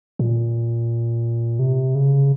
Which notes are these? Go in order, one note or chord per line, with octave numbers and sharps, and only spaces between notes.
A#2
C3
C#3